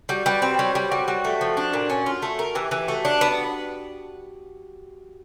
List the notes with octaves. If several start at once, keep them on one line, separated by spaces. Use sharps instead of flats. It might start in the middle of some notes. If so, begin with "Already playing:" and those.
G3 F#4
G3 B4
C4 C5
G3 C#5
G3 G4
G3 F#4
G3 F#4
A3
F3
D4
A#2
C#4
F4
A3
A#4
E3 G4
E3
A3 F#4
D4
B3